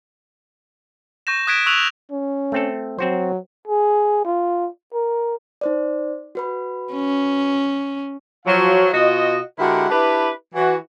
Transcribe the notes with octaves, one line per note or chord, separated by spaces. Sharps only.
C#6 G6 A#6 E7
D#6 F#6 G#6 B6 D7 E7
C#6 E6 F#6 F7 F#7
C#4
A3 C4 A4
F#3 C4 F#4 C5
G#4
F4
A#4
D#4 C5 D5
F#4 B4 B5
C#4
F3 F#3 F5
B2 F4 F#4 D#5
D3 G#3 E4 F#4 G4 A#4
D4 E4 G4 B4
E3 F#4